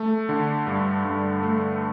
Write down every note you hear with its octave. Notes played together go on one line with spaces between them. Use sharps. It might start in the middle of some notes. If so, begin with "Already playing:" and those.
Already playing: A3
D3
G2
G2
A3